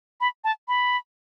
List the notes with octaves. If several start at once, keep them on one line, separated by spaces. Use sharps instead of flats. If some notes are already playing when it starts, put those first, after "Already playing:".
B5
A5
B5